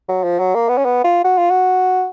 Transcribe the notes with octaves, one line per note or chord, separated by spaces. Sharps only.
F#3
F3
F#3
A#3
B3
C#4
B3
F4
F#4
F4
F#4